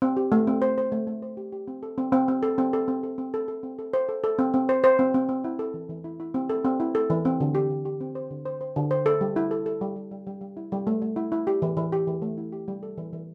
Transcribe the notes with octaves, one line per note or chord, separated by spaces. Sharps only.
C4
G4
A3
C4
C5
C5
A3
A3
C5
G4
G4
C4
A4
C4
C4
C4
A4
C4
A4
C4
A4
C4
A4
A4
C4
A4
C5
A4
A4
C4
C4
C5
C5
C4
C4
C4
E4
A4
E3
E3
E4
E4
C4
A4
C4
E4
A4
E3
C4
D3
G4
D3
G4
C4
C5
D3
C5
C5
D3
C5
A4
G3
E4
A4
A4
G3
G3
G3
G3
G3
E4
G3
A3
A3
E4
E4
G4
E3
E3
G4
E3
A3
E4
G4
G3
A4
E3
E3